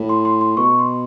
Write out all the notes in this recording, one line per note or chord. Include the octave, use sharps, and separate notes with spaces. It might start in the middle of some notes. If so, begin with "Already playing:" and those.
Already playing: A2
C6
C6
C6
B2 C#6
C6